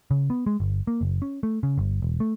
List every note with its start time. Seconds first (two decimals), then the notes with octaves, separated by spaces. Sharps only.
0.11 C#3
0.30 B3
0.47 G#3
0.60 G1
0.87 A#3
1.01 F#1
1.22 C#4
1.43 A3
1.63 C#3
1.78 G1
2.02 E1
2.20 A3